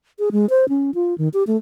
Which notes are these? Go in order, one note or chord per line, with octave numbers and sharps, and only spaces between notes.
G#4
G#3
C5
C#4
F4
D#3
G4
A3